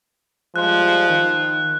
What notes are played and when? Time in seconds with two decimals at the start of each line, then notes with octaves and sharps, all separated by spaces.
0.56 F3 G3 G#3 F4 F#6
1.08 D#3